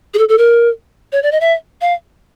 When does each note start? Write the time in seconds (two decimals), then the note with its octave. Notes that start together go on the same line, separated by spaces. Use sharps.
0.14 G#4
0.18 A4
0.29 A4
0.38 A#4
1.12 C#5
1.23 D5
1.32 D#5
1.41 E5
1.81 F5